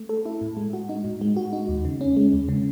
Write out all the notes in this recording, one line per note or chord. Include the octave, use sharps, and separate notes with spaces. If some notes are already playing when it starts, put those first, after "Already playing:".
Already playing: A3
A4
E4
A2
G#3
F#4
D#4
A2
G#3
F#4
D#4
D#2
C#3
C#4
G#3
D#2
C#3